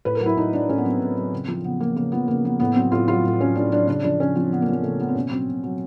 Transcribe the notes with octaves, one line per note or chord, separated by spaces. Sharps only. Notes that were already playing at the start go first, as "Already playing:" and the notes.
A2 B4
A#4
F#3
E4
A2 D#4
F#3 D4
A2 C#4
B3
F#3 C4
A2
F#3
C#3
F3
C#3 B3
F3 A#3
C#3 A#3
F3 B3
C#3 A#3
F3 B3
A2 B3
F#3 C4
A2 F4
F#3 F4
A2
F#3 C#4
A2 D4
F#3 D4
C#3 D4
F3 D4
C#3 C#4
F3 C4
C#3 B3
A#3
F3
A#3
C#3 A3
F3 B3
C4
B2 C#4
F#3 C4
B2
F#3